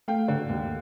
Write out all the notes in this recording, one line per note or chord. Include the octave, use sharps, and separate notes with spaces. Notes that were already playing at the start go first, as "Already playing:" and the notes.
A3 F5 G5
D3
D#2